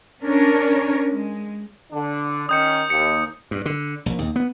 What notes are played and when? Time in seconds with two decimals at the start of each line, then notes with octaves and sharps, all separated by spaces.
0.22 C#4 D4 A#4 C#5
1.09 G#3
1.91 D3 D4
2.49 D#3 C#4 D#6 G6 C#7
2.90 D#2 C#7
3.51 G2
3.66 D3
4.06 A#1
4.19 D#2
4.36 B3